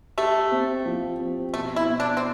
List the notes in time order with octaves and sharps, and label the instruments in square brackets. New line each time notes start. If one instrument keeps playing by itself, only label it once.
[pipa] A3 [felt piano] G4
[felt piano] C4
F3
C4
[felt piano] B2 [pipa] A3
[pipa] E4
[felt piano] B2
[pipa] D4
C4